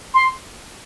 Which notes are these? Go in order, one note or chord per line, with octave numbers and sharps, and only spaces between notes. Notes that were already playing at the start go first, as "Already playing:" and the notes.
C6